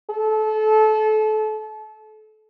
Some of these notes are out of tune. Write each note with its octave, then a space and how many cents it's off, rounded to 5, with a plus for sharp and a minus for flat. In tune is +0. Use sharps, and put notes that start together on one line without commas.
A4 -30